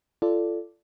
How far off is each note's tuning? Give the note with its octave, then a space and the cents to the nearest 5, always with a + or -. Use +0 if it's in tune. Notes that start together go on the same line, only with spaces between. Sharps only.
F4 -30 A4 +0 D5 +0